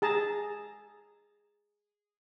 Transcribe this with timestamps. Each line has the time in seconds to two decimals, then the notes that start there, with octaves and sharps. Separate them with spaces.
0.02 G#4 A5 A#5